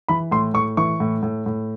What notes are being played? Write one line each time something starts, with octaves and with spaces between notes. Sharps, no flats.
E3 B5
A2 C6
A2 C#6
E3 C#6
A2
A2
A2